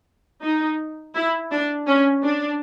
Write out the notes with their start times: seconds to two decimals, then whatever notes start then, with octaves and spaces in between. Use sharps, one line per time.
0.42 D#4
1.14 E4
1.51 D4
1.87 C#4
2.24 D4